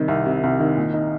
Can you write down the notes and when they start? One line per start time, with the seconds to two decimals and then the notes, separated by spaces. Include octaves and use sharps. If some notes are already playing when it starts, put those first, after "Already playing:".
Already playing: C3 D#3 G3
0.08 C2
0.26 C3
0.43 C2
0.60 D#3
0.76 A#2
0.94 D#4